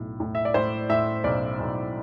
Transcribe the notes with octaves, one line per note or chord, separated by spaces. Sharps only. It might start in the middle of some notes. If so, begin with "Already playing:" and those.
Already playing: B1 A2
A2
E5
D5
A2 C5
A2 E5
B1 D5
B1